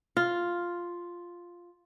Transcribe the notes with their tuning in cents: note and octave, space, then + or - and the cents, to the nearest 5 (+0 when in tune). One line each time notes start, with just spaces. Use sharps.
F4 +0